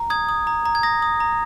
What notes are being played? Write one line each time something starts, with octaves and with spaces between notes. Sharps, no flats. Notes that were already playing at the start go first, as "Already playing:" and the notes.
Already playing: A#5
D#6 G#6
D#6
A#5
A#5
G#6
D#6 A#6
D#6
A#5